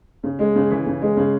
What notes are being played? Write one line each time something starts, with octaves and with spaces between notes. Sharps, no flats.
C#3
G#3
C#3
E3
C#3
G#3
C#3